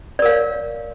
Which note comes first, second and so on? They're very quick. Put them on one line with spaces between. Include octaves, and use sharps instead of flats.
D5 A#4 F5 C#5